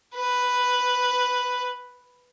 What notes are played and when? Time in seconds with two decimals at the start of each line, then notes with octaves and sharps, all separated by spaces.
0.15 B4